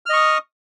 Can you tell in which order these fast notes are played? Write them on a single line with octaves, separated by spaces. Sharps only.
F6 D#5 C#6 D#6